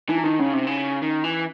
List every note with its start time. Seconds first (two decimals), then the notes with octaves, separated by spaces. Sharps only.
0.09 E3 D#4
0.18 E4
0.24 D#3 D#4
0.39 C#3 C#4
0.53 C3
0.67 C#3
1.02 D#3
1.24 E3